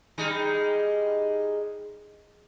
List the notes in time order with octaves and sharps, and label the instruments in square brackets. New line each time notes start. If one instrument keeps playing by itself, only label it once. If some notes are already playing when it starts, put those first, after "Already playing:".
[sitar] G3 G#3 D#4